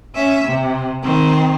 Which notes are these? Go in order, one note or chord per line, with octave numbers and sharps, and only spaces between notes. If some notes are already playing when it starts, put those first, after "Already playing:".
C#4 E5
C3
D#3 C4